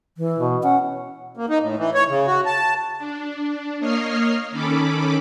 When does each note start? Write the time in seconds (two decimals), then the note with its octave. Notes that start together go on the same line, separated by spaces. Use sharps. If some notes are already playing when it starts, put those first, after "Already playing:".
0.18 E3
0.38 B2
0.63 C#4 F#5
1.37 A#3
1.50 D#4
1.61 A2
1.78 E3
1.94 C#5
2.09 C#3
2.27 F#4
2.46 A5
2.99 D4
3.79 A#3 C#5 D#5 F6 C7
4.51 D#3 C#4 A4 B5 D6